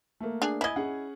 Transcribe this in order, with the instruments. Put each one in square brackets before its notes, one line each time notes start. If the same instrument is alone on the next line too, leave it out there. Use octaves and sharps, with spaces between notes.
[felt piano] A3 A#3
[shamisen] D4 G#4
[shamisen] E4 D#5 [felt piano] G#5 G#6
[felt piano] C#4 G#4 F#5